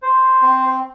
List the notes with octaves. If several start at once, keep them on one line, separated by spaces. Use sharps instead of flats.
C5
C4